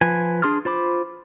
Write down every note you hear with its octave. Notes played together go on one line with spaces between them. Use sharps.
F3 B4 G#5
D4 G#4 C6 D#6 F6
F4 C5 B5 D6